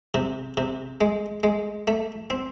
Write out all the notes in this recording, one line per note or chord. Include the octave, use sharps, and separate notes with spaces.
C3
C3
G#3
G#3
A3
C4